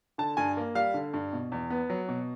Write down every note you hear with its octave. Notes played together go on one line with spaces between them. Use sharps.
D3 A5
G2 G#5
A#3
G3 F5
D3
G2
B2
E2
B3
F#3
B2